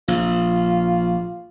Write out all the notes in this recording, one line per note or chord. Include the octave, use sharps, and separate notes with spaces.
A#1 F4